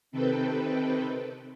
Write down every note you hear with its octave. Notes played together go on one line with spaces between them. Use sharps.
C3 D#3 C4 A4 B4 G5